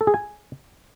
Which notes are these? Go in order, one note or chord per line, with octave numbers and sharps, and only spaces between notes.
A4
G#4
G#5